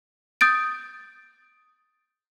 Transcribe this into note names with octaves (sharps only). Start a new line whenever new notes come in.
D#6 G6 A6 D7